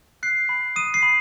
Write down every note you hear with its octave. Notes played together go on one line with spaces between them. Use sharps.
F#6 C7
B5
D#6 D#7
C7
B5